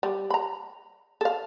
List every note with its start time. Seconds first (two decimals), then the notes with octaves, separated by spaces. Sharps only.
0.03 G3
0.30 A#5 B5
1.21 A4 F5